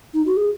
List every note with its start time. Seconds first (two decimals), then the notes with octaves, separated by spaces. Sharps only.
0.14 D#4
0.26 F#4
0.37 G#4